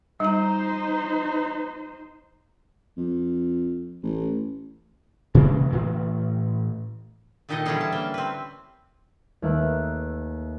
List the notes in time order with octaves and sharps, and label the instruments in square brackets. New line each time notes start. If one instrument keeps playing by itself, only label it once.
[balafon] G3 A#5 [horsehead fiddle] D#4 C5
[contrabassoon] F2
A1
[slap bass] C3 E3 G#3 A#3
A2 E3
[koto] A#2 D#3 D#4 E4 A4 D#5
D3 E3 G3 C#4 E4 G#4
A5
A#3 G5
C4 B4
[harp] D#2 A3 A#3 B4 E5 F#6